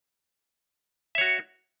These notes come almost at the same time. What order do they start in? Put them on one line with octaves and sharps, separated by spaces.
E5 C#5 F#4